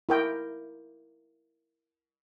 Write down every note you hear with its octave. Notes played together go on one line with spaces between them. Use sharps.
E4 A#4 G5